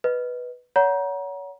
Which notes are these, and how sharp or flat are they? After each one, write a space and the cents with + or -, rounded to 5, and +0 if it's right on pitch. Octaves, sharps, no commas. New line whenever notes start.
B4 +0 D#5 +0
C#5 +35 F#5 +0 A#5 +30